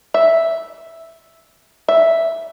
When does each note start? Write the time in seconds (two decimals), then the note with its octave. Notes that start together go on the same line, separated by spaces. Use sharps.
0.14 E5
1.88 E5